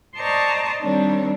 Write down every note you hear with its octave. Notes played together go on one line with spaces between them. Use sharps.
C5 D5 D#5 A5 A#5 C#6
D#3 G3 C4 D4 C#5